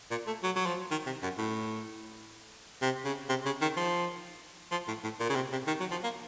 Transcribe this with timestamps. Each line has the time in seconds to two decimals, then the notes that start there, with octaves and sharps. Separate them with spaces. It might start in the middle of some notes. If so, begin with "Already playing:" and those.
0.11 A#2
0.27 A3
0.43 F#3
0.56 F#3
0.66 F3
0.91 D#3
1.06 C3
1.23 F#2
1.38 A2
2.82 C3
3.05 C#3
3.29 C3
3.46 C#3
3.62 D#3
3.77 F3
4.72 F3
4.88 A2
5.03 A2
5.20 A#2
5.30 C#3
5.35 C3
5.52 C3
5.67 D#3
5.80 F#3
5.91 F3
6.04 A#3